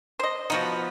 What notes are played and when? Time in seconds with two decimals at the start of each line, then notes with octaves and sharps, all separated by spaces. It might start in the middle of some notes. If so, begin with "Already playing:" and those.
0.19 C5 D#5
0.50 F3 B3 D#4 F#4